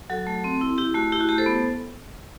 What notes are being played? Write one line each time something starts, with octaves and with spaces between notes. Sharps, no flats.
F#3 F#4 A4
A3
C4
E4
E4 G4
A3 F#4
E4 G4
F#4
A3 G4
A4 C5
B3